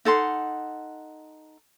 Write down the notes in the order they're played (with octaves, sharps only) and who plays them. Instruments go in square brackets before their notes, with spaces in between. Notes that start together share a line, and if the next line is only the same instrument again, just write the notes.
[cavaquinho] D#4 A4 F#5 C6